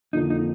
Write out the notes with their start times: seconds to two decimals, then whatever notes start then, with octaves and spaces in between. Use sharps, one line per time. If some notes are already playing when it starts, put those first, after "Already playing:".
0.13 F2 D3 F3 A#3 D#4
0.30 D#4